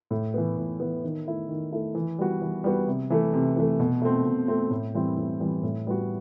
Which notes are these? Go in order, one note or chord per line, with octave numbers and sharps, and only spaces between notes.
A2
E3 B3
A2
E3 B3
D#3
A3 E4
D#3
A3 E4
E3
G3 B3 F#4
E3
G3 B3 F#4
C3
E3 A3
C3
E3 A3
B2
A3 C4
B2
A3 C4
A2
E3 G3 C4 E4
A2
E3 G3 C4 E4
A2
G3 B3 F#4